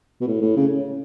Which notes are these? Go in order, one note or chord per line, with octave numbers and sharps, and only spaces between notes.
B2
A2
A2
C#3